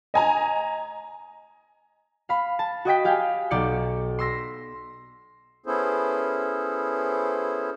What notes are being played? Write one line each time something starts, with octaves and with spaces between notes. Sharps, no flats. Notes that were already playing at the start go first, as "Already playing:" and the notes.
D#5 G#5 A#5
F5 B5
A5
F#4 D#5 G5 B6
G4 F5 G5 G#5
B1 D5 G6 C#7
C6 E6 A#6 B6
B3 C#4 E4 G#4 A4 C5